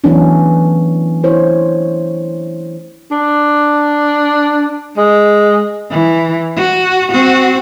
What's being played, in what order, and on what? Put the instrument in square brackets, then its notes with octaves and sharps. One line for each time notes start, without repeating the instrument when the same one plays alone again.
[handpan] E3 F#3 A3 B3 C#4 D4
E4 C5 C#5
[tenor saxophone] D4
G#3
[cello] E3
F#4
C4 F#4